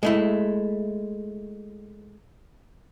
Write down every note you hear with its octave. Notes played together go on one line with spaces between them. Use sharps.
G#3 A3 E4